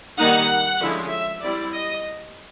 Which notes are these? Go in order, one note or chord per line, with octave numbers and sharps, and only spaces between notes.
D#3 G3 A#3 D#4 F#5
D3 F3 G#3 C#4 E4
E5
G3 C4 E4 D5
D#5